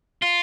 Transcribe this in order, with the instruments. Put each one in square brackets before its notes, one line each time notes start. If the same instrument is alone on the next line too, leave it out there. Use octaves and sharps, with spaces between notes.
[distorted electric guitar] F4